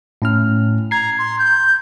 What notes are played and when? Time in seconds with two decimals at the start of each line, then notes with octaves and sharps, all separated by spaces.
0.22 A2 C#4 F6
0.91 A#5 G#6 C7
1.19 C6
1.39 G6